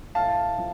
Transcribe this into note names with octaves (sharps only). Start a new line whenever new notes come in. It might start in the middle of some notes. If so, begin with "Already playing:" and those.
A2 F5 A5
F3